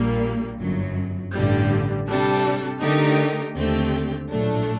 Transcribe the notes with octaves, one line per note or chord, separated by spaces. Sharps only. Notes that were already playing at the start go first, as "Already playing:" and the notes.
Already playing: A#1 A#2 G3 A#3
G1 F#2 F#3
A1 G2 D3 G3
C3 G3 D4 A4
D3 A3 D#4 G4 A#4
D#2 D3 A3 C4 G4
A#1 A2 F#3 A3 D4